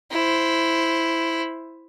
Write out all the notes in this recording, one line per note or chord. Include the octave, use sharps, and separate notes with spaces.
E4 C5